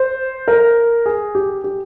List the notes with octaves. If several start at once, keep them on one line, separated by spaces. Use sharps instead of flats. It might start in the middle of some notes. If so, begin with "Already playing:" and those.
Already playing: C5
A#4
G#4
G4
G4